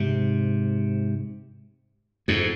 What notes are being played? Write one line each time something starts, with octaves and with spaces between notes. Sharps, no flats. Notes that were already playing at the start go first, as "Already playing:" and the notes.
Already playing: G#2 C3
F2 G#2